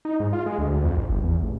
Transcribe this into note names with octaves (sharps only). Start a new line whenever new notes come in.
D#4
G#2
F4
G#3
D2
F2
A#1
G1
E2
A1